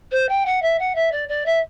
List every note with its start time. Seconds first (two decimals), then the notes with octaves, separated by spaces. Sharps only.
0.12 C5
0.29 G5
0.46 F#5
0.62 E5
0.79 F#5
0.95 E5
1.12 D5
1.29 D5
1.46 E5